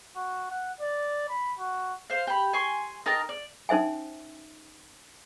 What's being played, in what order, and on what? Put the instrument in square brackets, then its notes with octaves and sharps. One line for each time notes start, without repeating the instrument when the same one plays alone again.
[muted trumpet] F#4
F#5
D5
B5
F#4
[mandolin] C5 F5
G4 B5
G#5 C6 C#6
D#4 A#4 G5 A5
D5
[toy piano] C#4 D#4 C5 E5 G#5